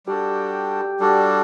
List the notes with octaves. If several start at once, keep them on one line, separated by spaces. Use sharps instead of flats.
G3 D4 F#4 G4 A4
G3 D4 F#4 A4